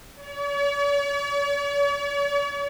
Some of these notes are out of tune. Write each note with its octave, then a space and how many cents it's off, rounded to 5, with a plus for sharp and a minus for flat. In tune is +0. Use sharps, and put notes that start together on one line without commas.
C#5 +45